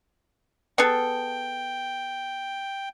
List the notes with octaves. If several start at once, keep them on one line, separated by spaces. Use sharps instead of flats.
B3 G#4 A4 G5